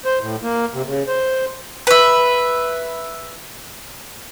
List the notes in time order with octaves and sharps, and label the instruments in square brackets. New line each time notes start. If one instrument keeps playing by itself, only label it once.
[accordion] C5
A2
A#3
C3
C#3
C5
[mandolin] B4 E5